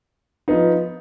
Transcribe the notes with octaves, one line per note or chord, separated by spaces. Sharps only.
F3 B3 D#4